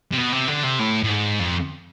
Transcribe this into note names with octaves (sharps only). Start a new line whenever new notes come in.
C3
B2
C3
D3
C3
A2
A2
G#2
F2